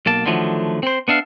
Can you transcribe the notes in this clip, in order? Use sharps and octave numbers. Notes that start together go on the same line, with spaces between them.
B1 A#3 A5
D3 D#3 F3 F#3 A3
C4 C5
B3 D4 E5 F5